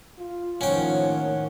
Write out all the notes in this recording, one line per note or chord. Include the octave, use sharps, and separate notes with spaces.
F4
A2 D#3 F3 A#3 C#4 C#5 F#5 G5